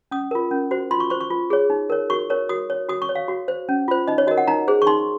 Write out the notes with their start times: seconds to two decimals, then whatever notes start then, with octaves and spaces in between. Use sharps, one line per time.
0.11 C#4 D#6
0.31 F4 A#4
0.51 C#4
0.71 F#4 C5
0.91 F4 C6
1.00 C#6
1.10 C5 C#6
1.21 C#6
1.31 F4
1.50 G#4 C#5
1.70 D#4
1.90 A#4 C#5
2.10 F#4 C#6
2.30 A#4 C#5
2.49 F#4 D#6
2.70 C#5
2.89 F#4 D#6
3.02 C#6
3.09 C#5
3.16 F5
3.28 F#4
3.48 C5
3.69 C#4
3.88 F4 C5
4.08 D#4 D#5
4.18 C#5
4.27 F#4 A#4 D#5
4.37 F#5
4.48 D#4 A#5
4.68 G#4 C5
4.82 C#6
4.87 D#4 C6